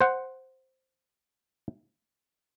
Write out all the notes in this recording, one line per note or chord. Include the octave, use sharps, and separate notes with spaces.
C5 F#5